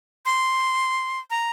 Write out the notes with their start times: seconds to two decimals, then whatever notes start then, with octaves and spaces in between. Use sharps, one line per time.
0.25 C6
1.30 A#5